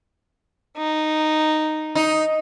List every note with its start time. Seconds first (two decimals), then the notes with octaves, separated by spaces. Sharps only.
0.77 D#4
1.95 D#4